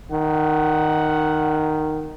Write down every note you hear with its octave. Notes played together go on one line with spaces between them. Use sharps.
D#3 F#5